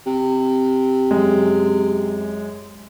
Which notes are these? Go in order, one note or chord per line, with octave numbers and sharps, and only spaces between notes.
C3
F#2 G#3